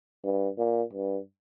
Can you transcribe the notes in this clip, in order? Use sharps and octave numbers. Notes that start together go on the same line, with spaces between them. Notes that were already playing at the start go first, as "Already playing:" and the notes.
G2
A#2
G2